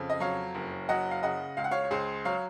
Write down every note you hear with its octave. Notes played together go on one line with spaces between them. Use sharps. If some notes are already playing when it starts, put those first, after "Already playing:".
Already playing: F2 C#3
D#5
F#3 C#5 F5
F#1
F#3 D#5 F#5
F5
C#3 D#5 F#5
C#2 F5
F#5
C#5 F5
C#5
C#2 G#4 C5
F#3 C#5 F5